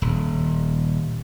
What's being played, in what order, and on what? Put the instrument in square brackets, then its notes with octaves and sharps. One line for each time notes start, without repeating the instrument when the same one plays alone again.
[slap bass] D#1